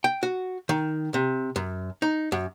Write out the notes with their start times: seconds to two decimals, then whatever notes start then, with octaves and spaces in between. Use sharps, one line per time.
0.04 G5
0.23 F#4
0.69 D#3
1.14 C3
1.56 F#2
2.02 D#4
2.32 F#2